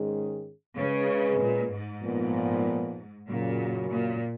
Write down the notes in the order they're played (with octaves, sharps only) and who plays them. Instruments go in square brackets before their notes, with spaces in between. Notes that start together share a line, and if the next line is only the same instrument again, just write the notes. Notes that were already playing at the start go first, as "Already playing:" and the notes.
Already playing: [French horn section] G#2 D#3 G#3 C#4 G#4
[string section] C#3 [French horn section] G#3 C#4 G#4 B4
[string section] A#2
G#2
[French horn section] A#2 F3 B3
[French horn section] F#2 C#3 F#3 [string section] A#2
[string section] A#2